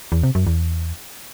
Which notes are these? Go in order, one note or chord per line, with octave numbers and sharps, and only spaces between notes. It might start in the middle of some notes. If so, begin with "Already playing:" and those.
E2
C3
F#2
E2